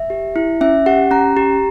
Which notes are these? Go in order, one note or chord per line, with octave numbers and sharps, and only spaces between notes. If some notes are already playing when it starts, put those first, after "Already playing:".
Already playing: E5
G4
E4
C#4 E5
G4 F#5
C#4 A#5
G4